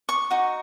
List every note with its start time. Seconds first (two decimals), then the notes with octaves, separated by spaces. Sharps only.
0.09 C#6
0.31 D#4 F#4